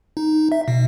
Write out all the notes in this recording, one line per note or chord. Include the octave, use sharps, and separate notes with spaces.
D#4
E5
B2